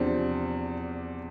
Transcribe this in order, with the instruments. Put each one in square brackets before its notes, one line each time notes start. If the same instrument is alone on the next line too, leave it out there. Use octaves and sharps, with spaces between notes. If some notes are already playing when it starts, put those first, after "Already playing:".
Already playing: [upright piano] E2 C3 F3 C4 D4